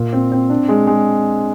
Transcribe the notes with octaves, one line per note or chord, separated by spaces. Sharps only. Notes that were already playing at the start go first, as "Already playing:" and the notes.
Already playing: A#2
C4
C4
D4
G#3
G#3